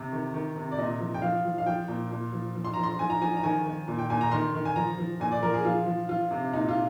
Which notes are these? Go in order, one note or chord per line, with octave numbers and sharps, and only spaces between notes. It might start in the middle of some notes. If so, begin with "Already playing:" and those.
Already playing: C3
D#3
D#3
C3
D5
A#2 D#5
F3
G5
F3 F5
F3
F5
F3 G5
A#2
A#2
F3
F3
C6
F3 A#5
C6
F3 G#5
A#5
F3 G#5
A#5
D#3 G#5
D#3
A#2
G5
A#2 G#5
A#5
D#3 C6
D#3
G#5
F3 A#5
F3
A#2 G#5
D5
F3 A#4
G#4
F3 F4
F3
F3 F4
C3
A#2 D#4
F4